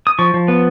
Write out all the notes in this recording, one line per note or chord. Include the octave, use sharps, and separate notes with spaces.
D#6
F3 C#6
F3
B3